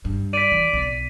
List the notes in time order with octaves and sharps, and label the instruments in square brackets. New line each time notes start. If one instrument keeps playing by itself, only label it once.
[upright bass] G2
[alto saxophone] D5 [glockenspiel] B6 D#7
[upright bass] E3
B1